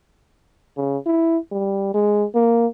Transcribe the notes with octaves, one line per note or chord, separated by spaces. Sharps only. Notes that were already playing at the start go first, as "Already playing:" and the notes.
C#3
E4
G3
G#3
A#3